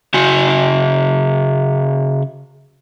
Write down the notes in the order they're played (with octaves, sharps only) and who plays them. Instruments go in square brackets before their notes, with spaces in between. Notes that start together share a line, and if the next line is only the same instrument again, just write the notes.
[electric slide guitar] C#3 F#4 G#5